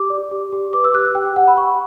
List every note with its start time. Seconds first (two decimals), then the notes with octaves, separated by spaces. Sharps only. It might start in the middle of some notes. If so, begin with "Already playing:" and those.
Already playing: G4 D6
0.10 D5
0.31 G4
0.52 G4
0.73 B4 D6
0.84 E6
0.94 G4 F#6
1.05 E6
1.15 G4 G5
1.25 G5
1.36 G4 F#5
1.48 B5
1.57 G4 C#6